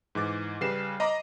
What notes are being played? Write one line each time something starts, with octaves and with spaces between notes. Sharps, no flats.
G#2 E3 D6 A6
C#3 G3 B4 C7 E7
D#5 A#5 B5 D6